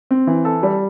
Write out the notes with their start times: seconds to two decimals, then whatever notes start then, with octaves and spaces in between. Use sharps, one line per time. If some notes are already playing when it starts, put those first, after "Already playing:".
0.11 C4
0.27 E3
0.45 A4
0.63 G3